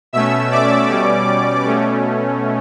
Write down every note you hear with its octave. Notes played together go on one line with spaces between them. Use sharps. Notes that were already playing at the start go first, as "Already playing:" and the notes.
B2 A3 C#4 E5 E6
D5 D6
B2 G3 C#4
B2 A3 C#4